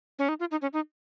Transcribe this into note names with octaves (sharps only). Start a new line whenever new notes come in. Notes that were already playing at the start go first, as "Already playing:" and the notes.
C#4
D#4
F4
D#4
C#4
D#4